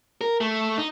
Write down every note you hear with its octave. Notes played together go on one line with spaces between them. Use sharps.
A#4
A3
D#4